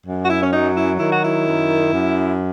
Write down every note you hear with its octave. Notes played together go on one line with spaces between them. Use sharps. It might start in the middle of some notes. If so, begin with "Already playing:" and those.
F#2
F#4
E4
C#4
F#3 D#4
E4
D#3 E4
F#4
E4
F#2
F#2